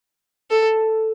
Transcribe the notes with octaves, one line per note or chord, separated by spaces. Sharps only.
A4